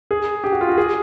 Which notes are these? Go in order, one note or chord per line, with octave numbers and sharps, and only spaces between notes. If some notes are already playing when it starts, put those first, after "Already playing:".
G#4
G4
F#4
F4
F#4
G#4